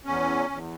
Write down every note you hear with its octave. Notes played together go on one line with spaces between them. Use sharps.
E2 C#4
E2